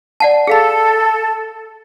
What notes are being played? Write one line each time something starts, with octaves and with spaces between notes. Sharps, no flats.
D5 F#5 A5
G#4 A4 F5 B5